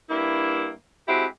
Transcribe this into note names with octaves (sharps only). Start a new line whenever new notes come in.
G2 A#3 E4
G#3 C4 E4 F#4 G4